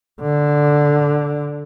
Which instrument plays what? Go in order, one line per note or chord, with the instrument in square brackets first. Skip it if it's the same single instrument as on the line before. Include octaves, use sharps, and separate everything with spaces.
[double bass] D3